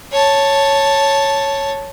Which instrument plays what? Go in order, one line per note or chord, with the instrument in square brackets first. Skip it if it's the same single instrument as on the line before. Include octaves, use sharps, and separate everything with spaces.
[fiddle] C#5 A5